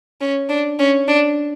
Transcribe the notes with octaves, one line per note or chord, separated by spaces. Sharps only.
C#4
D4
C#4
D4